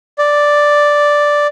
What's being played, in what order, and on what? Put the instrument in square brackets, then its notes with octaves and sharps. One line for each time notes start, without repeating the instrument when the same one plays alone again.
[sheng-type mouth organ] D5